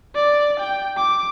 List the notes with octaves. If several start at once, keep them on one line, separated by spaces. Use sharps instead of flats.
D5
G5
D6